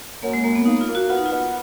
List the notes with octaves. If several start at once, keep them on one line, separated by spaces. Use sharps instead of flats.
F#2 A#3
G#3
F#2 A#3
B3
A#3 D#4
F4
A#3
F#4
B3 F4
D#4
F4
B3